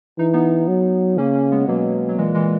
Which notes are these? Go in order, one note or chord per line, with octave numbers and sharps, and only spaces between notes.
E3 D#4
B3 D#4
F#3
C#3 A#3 C#4
A#3 C#4
G#3 B3
B2 F#3 A#3
F#3
A#2 E3 G#3
E3 G#3